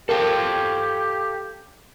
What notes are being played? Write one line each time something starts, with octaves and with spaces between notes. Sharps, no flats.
G4 A4 A#4 F5 G5